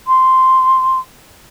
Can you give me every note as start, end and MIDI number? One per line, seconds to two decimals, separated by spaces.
0.07 0.99 84